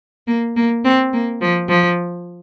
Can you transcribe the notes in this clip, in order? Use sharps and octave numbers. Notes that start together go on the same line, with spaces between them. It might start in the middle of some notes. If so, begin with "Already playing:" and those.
A#3
A#3
C4
A#3
F3
F3